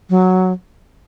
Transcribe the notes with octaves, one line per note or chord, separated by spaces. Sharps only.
F#3